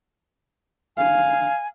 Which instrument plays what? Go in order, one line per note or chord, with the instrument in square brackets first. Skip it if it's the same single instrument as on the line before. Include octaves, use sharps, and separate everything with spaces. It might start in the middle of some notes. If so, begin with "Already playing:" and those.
[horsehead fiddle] F5 [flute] G#5